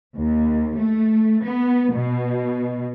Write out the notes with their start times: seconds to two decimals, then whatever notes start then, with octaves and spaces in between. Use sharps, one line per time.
0.16 D#2
0.77 A3
1.44 B3
1.93 B2